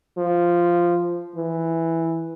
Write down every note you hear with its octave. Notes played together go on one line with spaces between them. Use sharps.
F3
E3